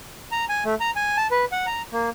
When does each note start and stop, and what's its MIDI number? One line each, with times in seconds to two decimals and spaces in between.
0.32 0.45 82
0.49 0.64 80
0.65 0.75 57
0.80 0.91 82
0.96 1.17 80
1.17 1.27 81
1.31 1.45 71
1.52 1.66 78
1.66 1.82 82
1.92 2.10 58